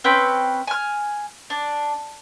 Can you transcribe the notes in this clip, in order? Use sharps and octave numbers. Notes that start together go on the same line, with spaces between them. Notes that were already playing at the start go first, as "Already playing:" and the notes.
C4 C#4 B4 G5
G#5 F6
D4